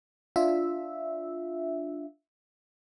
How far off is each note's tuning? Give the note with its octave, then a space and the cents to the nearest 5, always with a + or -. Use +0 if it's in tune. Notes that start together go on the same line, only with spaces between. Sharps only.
D4 +0 F4 +0 E5 -5